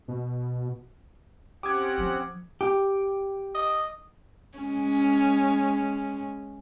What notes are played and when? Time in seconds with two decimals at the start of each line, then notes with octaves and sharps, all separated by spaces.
0.08 B2
1.63 C4 C#4 G4 F#5 D6 D#6 G#6
1.98 F3
2.61 G4
3.55 D#5
4.58 G#3 C#4